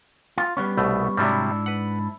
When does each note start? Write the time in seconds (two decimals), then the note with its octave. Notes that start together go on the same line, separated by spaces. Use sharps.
0.38 F4
0.57 G3 B3 C#4
0.77 C2 B2 A3
1.17 G#2 C3 F#3 G3 D4 E4
1.66 B4 F#5